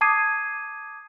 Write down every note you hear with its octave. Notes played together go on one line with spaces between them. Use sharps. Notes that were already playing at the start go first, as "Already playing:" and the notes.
A5 D6 D#6 G#6 C7 D#7